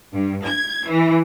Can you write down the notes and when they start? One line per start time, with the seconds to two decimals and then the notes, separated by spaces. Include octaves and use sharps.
0.12 G2
0.45 G#6
0.87 E3